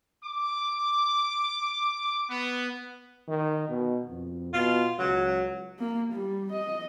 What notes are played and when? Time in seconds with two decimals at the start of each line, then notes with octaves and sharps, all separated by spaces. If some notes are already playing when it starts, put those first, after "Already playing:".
0.24 D6
2.28 B3
3.28 D#3
3.69 B2
4.08 F2
4.54 B2 F4
4.99 C#2 F#3
5.79 A#3
6.13 G3
6.52 D#5